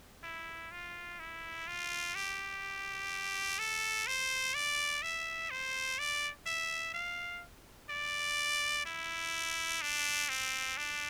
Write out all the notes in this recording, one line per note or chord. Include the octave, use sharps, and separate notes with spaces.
E4
F4
E4
F4
G4
A4
C5
D5
E5
C5
D5
E5
F5
D5
E4
D4
C4
D4